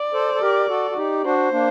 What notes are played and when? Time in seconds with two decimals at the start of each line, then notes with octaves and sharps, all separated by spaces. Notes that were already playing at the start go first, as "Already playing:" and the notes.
Already playing: D5
0.14 A4 C5
0.34 A4
0.41 G4 A#4
0.69 F#4 A4
0.91 F#4
0.97 D#4 G4
1.24 D4 F#4 C5
1.52 A#3 D4